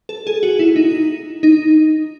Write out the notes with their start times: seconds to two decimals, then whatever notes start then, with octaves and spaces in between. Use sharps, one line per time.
0.09 A4
0.27 G#4
0.43 F#4
0.59 E4
0.76 D#4
1.43 D#4